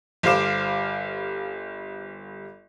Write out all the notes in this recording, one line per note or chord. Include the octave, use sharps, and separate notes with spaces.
G1 G3 C5 F5 D6 E7